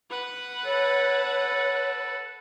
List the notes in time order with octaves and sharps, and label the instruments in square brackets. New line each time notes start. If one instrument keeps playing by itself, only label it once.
[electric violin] B4 F#5
[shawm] A4 [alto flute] C#5